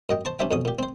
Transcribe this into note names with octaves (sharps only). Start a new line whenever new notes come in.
F#2 D#5 G5
C5 A5 C#6
C#4 D4 G4 C5 E5 G5
F2 B2 C#4 D#6
A#2 G4
C4 C5